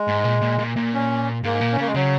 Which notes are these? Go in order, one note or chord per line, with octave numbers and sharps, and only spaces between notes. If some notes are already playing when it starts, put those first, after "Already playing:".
Already playing: G#3
G#2
A#2
A#2
A#2
A#2
C#4
G#2 A#3
A#2
C#4
C#3 A#3
G#3
C#3 F#3